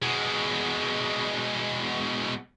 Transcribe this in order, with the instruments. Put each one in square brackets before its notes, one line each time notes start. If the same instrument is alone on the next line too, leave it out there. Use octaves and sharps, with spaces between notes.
[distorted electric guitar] B2 G#3